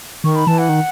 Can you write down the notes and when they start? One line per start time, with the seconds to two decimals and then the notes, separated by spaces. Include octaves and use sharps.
0.24 D#3 C#6
0.35 B5
0.47 E3 A5
0.58 F#5
0.69 D#3